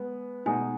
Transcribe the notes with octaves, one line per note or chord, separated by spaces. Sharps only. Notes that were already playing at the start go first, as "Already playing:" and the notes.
Already playing: G#3 B3 B4
B2 G#3 D#4 G#5